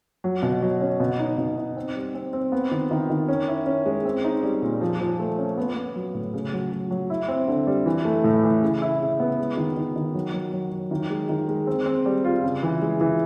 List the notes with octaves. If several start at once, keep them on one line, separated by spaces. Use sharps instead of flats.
F#3
B2
F#3
C#4
B2
D#4
B2
D#4
C4
G3
C4
C4
B3
D#3
D#3
D#3
C#4
E4
C#4
G#3
C4
D#4
G3
A#2
F3
F3
A3
C#4
B3
B3
F#3
A2
C#3
F#3
F#3
F#3
E4
C4
D3
G3
E3
A3
A2
E3
C#3
E4
C#3
B3
G#3
D#3
D#3
D#3
F#3
F#3
F#3
F#3
D#3
G#3
D#3
G#3
C4
C4
G3
F4
C#3
E3
G#3
E3